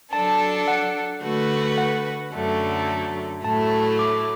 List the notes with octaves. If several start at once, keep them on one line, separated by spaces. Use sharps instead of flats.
F#3 D4 A4 A5
F#5
D3 A3 F#4 B4
F#5
F#2 D3 F#3 A3
A2 F#3 A3 E4 A5
D6